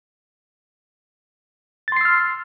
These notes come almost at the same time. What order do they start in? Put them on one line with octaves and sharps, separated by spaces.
A6 C6 C7 E6 F6